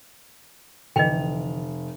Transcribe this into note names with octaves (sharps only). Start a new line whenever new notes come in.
F1 D3 E3 D#5 G5 F7